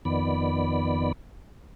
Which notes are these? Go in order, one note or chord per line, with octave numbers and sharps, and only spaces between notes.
F2 D#3 B3 D5 B5